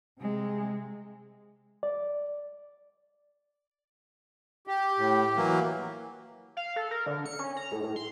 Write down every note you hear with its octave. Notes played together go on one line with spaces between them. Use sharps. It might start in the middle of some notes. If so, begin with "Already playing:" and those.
C3 G#3
D5
G4
A2
E3 F#3 A#3
F5
A4
A#4
D3
C#7
C#4
A#5
A2
A2
C6